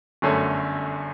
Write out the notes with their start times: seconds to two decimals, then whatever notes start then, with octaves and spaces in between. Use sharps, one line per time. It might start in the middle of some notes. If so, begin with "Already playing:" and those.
0.22 G1 F#2 D3 A3 C#4